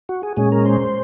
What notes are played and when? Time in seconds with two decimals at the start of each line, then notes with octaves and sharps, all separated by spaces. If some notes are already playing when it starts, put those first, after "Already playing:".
0.09 F#4
0.23 G#4
0.37 A#2 G#3 C#4 G#4
0.52 A#4
0.66 C5